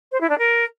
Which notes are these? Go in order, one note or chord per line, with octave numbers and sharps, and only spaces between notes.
C5
E4
D4
A#4